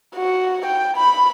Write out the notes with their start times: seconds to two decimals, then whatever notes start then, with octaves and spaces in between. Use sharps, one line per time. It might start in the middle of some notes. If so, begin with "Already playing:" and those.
0.16 F#4
0.66 G5
0.97 B5